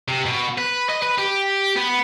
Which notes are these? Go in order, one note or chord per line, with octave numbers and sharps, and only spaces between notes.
C3
B2
B4
D#5
B4
G4
B3